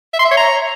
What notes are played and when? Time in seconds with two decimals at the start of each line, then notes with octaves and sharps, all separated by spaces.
0.13 E5
0.19 C6
0.25 E5
0.31 C#5
0.37 A#5